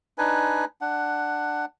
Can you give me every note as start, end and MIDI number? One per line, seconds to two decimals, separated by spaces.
0.18 0.65 62
0.18 0.65 63
0.18 0.65 71
0.18 0.65 80
0.81 1.65 62
0.81 1.65 78